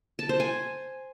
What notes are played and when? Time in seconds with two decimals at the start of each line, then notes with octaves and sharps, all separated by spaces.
0.19 A5
0.29 C5
0.40 G#5